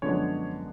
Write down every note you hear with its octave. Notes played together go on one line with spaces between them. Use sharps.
F#2 D3 F3 G#3 B3 C#5